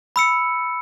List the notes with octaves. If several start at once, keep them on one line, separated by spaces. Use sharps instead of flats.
B5 E6 C#7